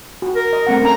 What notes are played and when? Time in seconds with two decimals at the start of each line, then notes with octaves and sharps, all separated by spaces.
0.22 F#4
0.36 A#4
0.53 D#5
0.67 A3 C4 F#5
0.82 C#4 A#5